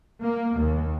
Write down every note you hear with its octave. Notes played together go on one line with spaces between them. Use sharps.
A#3
D#2